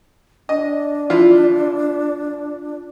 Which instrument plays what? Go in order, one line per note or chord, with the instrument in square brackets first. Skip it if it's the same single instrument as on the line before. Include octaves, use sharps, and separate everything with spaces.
[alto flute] D4 [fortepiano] D#5
[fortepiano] F3 E4 F4